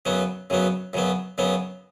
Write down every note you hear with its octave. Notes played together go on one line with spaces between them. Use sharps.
F#2 C#3 F#3 B3
F#2 C#3 F#3 B3
F#2 C#3 F#3 B3
F#2 C#3 F#3 B3